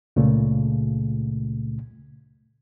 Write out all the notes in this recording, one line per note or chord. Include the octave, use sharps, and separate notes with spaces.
C#2 A#2 C#3 A3